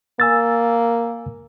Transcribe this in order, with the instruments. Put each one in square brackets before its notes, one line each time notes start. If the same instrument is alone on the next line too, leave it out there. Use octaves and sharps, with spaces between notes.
[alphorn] A#3 [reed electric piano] G#5 E6 A6